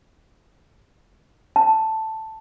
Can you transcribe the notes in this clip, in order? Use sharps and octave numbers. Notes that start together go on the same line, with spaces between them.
A5